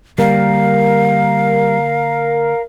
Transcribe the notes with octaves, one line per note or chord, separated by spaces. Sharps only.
D3 G3 A#3 A#4 F5